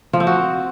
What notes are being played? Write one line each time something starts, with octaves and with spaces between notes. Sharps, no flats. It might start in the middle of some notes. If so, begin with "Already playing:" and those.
F3
C4
F#4